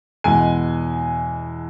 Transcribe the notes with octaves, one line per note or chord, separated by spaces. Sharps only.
E2 B2 G#3 G#5